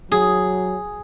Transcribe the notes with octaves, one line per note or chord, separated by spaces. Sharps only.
F#3 G#4